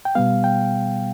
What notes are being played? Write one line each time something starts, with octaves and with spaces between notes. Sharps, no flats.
G5
B2 G3 B3 F5
G5